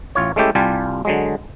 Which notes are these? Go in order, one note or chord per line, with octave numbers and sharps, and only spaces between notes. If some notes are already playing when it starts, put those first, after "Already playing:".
A1 F4 C#5
G#3 A3 C#4 E4 G4 A4
C2 G3 F4 G4 G#5 A5
D3 F#3 G#3